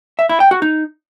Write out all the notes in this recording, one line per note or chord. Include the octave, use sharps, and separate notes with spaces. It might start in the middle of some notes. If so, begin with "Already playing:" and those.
E5
E4
G5
F#4
D#4